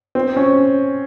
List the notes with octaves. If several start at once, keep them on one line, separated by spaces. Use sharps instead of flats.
C4
C#4